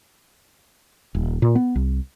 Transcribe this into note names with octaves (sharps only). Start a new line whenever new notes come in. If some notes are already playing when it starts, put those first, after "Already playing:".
D#1
A#2
B3
C2